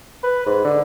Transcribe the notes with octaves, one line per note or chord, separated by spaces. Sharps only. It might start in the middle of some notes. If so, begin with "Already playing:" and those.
B4
G#2
D3